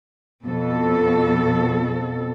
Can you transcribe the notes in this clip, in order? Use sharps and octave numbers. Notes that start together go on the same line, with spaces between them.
F2 B2 A4